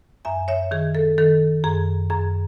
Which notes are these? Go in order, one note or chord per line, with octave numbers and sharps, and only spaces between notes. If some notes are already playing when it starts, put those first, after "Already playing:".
F#2 E5 G#5
C#5 E5
D#3 G#4
A4
D#3 A4
F#2 G#4
F#2 G#4